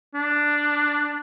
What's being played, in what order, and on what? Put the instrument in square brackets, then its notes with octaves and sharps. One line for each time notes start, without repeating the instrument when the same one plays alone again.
[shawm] D4